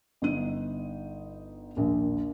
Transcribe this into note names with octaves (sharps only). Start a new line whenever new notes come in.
G1 D#4 D#7
A#1 D#2